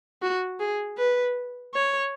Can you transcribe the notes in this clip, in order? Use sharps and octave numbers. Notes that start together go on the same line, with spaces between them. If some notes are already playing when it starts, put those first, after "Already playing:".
F#4
G#4
B4
C#5